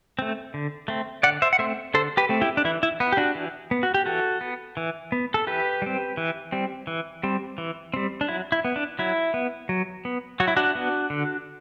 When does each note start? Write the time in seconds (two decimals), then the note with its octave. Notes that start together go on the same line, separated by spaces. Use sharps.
0.19 A3 C4
0.54 D3
0.88 A3 C4
1.23 D3 D5 F#5
1.42 C5 E5
1.53 F#5
1.59 A3 C4 C5 E5
1.94 D3 A4 C5
2.17 G4 B4
2.29 A3 C4
2.41 E4 G4
2.57 D4
2.65 E3 E4
2.83 E4
3.00 B3
3.12 G4
3.17 D4 F#4
3.35 E3
3.71 B3
3.83 F#4
3.94 G4
4.06 E3 F#4 A4
4.41 B3
4.77 E3
5.12 B3
5.34 A4
5.47 E3 G4 B4
5.82 G3 C4
6.17 E3
6.52 G3 C4
6.87 E3
7.23 G3 C4
7.58 E3
7.94 G3 C4
8.21 D4
8.28 F#3 E4
8.52 E4
8.65 B3
8.76 D4
8.99 F#3 E4
9.34 B3
9.69 F#3
10.05 B3
10.40 F#3 F#4
10.48 E4
10.56 D4 F#4
10.75 B3
11.10 D3